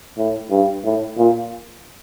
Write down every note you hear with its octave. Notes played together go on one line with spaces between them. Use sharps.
A2
G2
A2
A#2